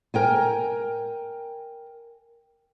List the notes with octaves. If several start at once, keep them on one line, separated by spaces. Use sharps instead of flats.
A#4 G5 G#5